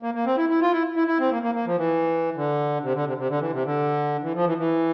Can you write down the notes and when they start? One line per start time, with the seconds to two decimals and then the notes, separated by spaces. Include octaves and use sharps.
0.02 A#3
0.14 A#3
0.26 C4
0.38 E4
0.49 E4
0.61 F4
0.72 E4
0.96 E4
1.08 E4
1.20 C4
1.31 A#3
1.43 A#3
1.55 A#3
1.66 F3
1.77 E3
2.36 D3
2.83 C3
2.94 D3
3.06 C3
3.18 C3
3.29 D3
3.40 E3
3.53 C3
3.64 D3
4.22 E3
4.35 F3
4.46 E3
4.58 E3